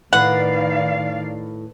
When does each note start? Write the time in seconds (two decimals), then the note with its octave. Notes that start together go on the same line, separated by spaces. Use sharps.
0.13 A2 D#3 B4 D5 F5 F#5